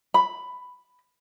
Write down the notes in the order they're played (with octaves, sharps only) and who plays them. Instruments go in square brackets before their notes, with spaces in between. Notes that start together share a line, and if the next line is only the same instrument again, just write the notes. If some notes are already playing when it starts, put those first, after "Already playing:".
[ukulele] B5